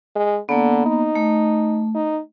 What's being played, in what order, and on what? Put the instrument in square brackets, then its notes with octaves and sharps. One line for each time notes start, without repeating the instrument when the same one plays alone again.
[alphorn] G#3
[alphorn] D3 [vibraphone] A#3 B3
[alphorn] D#4
[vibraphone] A3
[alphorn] D#4